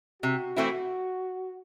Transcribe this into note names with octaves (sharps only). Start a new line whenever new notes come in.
C3 F#4
E3 A3 C4 E4